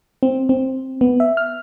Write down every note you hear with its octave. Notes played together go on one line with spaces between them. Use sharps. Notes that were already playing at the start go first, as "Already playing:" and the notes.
C4
C4
B3
E5
F6